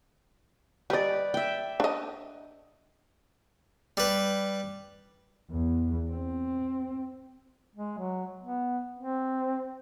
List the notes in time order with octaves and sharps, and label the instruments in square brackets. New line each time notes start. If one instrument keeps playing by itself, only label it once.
[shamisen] G3 D#5 [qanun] B4 D5
[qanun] E5 G5
[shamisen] D4 D#5
[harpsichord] G3 B4
[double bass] E2
C4
[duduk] G#3
F#3
B3
C4